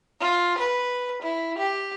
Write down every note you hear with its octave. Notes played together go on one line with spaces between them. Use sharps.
F4
B4
E4
G4